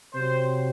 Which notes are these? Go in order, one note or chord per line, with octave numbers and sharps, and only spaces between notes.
C3 F#3 C4 C5